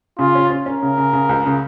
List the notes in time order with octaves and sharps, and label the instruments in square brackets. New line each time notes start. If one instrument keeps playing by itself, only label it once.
[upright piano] C#3 [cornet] F4
[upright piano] C#4
C#4
[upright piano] C#4 [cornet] A#4
[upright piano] C#3
C#3
C#3
C#2
C#3